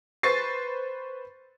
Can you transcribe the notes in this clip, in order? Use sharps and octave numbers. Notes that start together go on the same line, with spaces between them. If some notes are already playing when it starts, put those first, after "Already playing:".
B4 C5 C#6 A6 C7